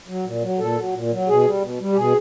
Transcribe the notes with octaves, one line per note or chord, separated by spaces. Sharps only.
F#3
A#2
F#3
A#2 A4
F#3
A#2
F#3
B2 G#4
G3
B2
G3
G4
B2 G#4